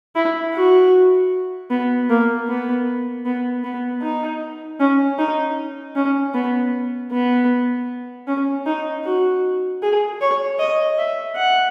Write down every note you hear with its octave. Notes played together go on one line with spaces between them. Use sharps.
E4
F#4
B3
A#3
B3
B3
B3
D#4
C#4
D#4
C#4
B3
B3
C#4
D#4
F#4
G#4
C#5
D#5
E5
F#5